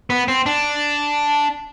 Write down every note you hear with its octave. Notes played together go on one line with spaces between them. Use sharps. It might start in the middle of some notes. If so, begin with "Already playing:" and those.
B3
C4
D4